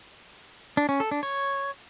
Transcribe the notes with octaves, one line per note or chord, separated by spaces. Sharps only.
D4
C#4
A4
D4
C#5